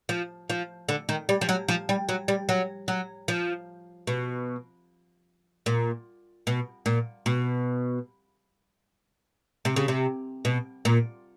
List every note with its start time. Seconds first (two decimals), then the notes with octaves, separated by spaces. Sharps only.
0.09 F3
0.50 F3
0.89 D3
1.09 D#3
1.29 G3
1.41 F3
1.49 F#3
1.68 F3
1.89 G3
2.09 F#3
2.28 G3
2.49 F#3
2.88 F#3
3.28 F3
4.07 B2
5.66 A#2
6.47 B2
6.86 A#2
7.26 B2
9.65 C3
9.76 C#3
9.88 C3
10.45 B2
10.85 A#2